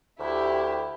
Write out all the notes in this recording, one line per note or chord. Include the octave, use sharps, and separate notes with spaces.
D2 E4 G4